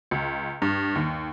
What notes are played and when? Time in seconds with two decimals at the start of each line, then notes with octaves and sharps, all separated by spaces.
0.11 C#2
0.62 G2
0.95 D#2